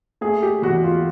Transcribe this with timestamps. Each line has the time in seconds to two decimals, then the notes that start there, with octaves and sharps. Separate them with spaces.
0.21 A3 G#4
0.43 G4
0.62 E2 F#4
0.84 F4